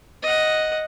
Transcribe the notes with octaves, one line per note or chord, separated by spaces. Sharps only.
D#5 F#5